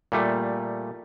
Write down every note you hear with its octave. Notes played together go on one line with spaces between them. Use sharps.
A#2 G3 A3